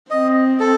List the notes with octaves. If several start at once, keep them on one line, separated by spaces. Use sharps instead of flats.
C4 D#5
A4